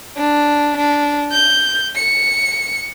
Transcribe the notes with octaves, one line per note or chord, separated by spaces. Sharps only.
D4
D4
G6
C#7